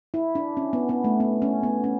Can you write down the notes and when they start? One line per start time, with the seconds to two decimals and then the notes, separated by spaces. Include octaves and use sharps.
0.14 E4
0.35 D4
0.57 C#4
0.73 B3
0.89 B3
1.04 A3
1.20 B3
1.42 C#4
1.63 B3
1.84 C#4